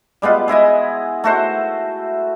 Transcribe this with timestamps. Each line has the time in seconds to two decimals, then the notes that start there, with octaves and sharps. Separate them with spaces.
0.22 G3 G#3 B3 F4
0.48 G#3 E4 D#5 G#5
1.24 A3 F#4 C5